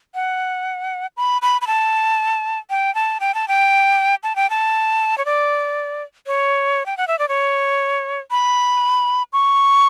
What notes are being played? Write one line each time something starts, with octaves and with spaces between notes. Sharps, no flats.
F#5
B5
B5
B5
A5
G5
A5
G5
A5
G5
A5
G5
A5
C#5
D5
C#5
G5
F#5
E5
D5
C#5
B5
C#6